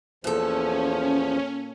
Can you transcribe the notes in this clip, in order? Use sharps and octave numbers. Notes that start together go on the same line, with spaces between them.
E2 A#2 F3 C#4 A4